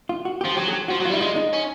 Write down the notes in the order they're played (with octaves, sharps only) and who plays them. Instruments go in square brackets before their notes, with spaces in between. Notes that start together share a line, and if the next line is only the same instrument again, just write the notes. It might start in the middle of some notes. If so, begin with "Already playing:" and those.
[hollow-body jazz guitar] F4
F#4
G4
[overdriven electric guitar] F3
[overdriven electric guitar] F#3 [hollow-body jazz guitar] G4
[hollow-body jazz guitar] G#4
G4
[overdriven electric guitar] F3 [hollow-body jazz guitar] F#4
[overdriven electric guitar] F#3
[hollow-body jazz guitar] F4
[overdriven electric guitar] G3 [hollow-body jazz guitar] E4
[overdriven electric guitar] G#3 [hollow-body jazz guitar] F4
[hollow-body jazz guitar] D#4
[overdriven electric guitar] C#4